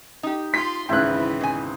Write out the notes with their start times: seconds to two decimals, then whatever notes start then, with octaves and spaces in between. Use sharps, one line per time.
0.23 D#4 G4
0.54 F4 C6 B6
0.89 G#1 C#2 E3 B3 C4 E4 F#6
1.41 B2 G#5